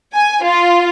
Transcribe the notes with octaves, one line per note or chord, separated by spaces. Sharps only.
G#5
F4